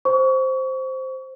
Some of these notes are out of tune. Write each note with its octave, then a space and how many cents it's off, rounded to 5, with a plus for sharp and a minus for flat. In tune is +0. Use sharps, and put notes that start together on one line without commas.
C5 +0 C#6 +30